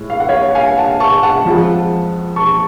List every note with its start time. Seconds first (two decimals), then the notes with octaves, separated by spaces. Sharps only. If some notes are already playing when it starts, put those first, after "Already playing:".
Already playing: A2 G#3
0.10 F5
0.20 F#5
0.29 C#5 F5
0.55 F5 G#5
0.78 F#5 A5
1.00 A5 C#6
1.23 F#5 A5
1.45 F2 F3 G#3
2.36 A5 C#6